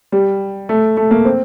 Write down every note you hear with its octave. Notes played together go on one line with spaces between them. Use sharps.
G3
A3
A3
A#3
C4